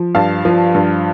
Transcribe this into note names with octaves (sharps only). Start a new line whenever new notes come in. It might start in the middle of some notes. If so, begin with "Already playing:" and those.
Already playing: F3
G2 F5 A5
F3
G2